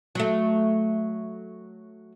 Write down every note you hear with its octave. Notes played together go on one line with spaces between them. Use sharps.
F#3 A3